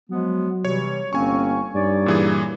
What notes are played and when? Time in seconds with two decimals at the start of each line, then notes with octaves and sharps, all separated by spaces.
0.10 F3 F#3 G#3 B3
0.65 C3 E3 G3 C#5
1.13 G1 A#3 C4 C#4 G#5 C#6
1.75 G2 D#4 C#5 D5
2.06 A#2 E3 G#4